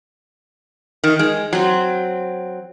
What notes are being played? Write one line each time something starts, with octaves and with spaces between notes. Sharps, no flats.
D#3
G#3
F#3 C4